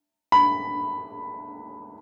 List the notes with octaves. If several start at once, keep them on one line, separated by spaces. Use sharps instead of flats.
B5